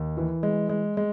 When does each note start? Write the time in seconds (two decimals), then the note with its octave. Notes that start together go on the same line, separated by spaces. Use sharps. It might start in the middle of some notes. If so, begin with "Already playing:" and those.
Already playing: D#2
0.17 E3
0.43 G#3
0.69 G#3
0.97 G#3